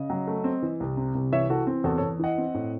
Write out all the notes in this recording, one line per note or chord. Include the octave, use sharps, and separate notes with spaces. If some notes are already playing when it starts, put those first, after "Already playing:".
Already playing: C#3 D#5
F#3
A3
C4
E3
C2
C3
C2
E3 C#5 E5
E3 F#4 A4
C4
E2 F#4 A4
E2 A4 C#5
E3 D#5 F#5
C4
A2